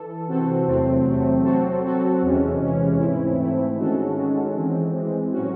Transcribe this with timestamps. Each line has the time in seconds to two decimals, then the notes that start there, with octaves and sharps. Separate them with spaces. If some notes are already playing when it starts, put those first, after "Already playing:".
Already playing: E3 A4
0.27 C3 E3 C4 F#4 A4
0.67 E2 C3 F#3 A3 C4
1.05 E2 C3 F#3 A3 C4
1.44 F#3 C4 F#4 A4
1.83 F#3 C4 F#4 A4
2.22 E2 C3 E3 G#3 C#4
2.61 E2 C3 E3 G#3 C#4
2.99 G#2 E3 A3 C4 E4
3.39 G#2 E3 A3 C4 E4
3.77 D#3 G#3 C#4 F#4 A4
4.16 D#3 G#3 C#4 F#4 A4
4.54 E3 G#3 C4
4.93 E3 G#3 C4
5.32 A2 F#3 C#4 F#4